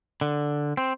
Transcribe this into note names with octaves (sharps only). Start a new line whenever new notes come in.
D3
C4